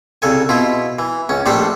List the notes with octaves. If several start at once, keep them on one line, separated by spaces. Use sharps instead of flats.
C2 C#3 A4 G#5
B2 E4 F4
E3
C#2 C#4
A#1 G3 A3 D4 A4 C5